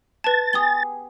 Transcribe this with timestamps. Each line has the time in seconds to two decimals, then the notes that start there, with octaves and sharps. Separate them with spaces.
0.24 B4 A5 A6
0.53 B3 G4 G#4 D#6 G7